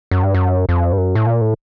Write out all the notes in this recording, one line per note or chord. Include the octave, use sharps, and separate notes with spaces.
F#2
G2
F#2
F2
G2
F#2
A2
A#2
A2